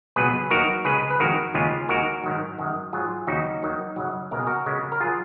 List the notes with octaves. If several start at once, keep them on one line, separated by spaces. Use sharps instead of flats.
C#2 B2 F#3 G#4 B4
D#2 D#3 F#3 F#4 A#4
C#2 C#3 G#3 G#4 B4
B4
F2 D#3 G#3 F#4 A#4
D#2 C#3 G#3 F4 G#4
D#2 D#3 G#3 F#4 A#4
G#2 D#3 F#3
F#2 D#3 G#3
G#2 F#3 F4 G#4
D#2 C#3 F#3 D#4 F#4
D#2 D#3 F#3
F#2 C#3 F#3
C#2 B2 G#3 A#4
G#4
F#4 A#4
C#2 C#3 G#3
A#4
F#3 F4 G#4